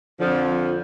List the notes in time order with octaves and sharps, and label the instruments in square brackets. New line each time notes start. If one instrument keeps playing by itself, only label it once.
[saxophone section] F2 D3 F3